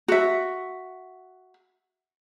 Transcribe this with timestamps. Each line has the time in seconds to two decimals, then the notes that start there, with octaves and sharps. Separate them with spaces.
0.08 F#4 E5